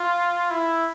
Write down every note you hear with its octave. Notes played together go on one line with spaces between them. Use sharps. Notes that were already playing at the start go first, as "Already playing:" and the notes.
Already playing: F4
E4